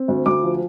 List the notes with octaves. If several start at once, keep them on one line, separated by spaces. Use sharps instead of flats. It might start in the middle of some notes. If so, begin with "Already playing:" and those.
Already playing: C4
D2
D2 D6
F3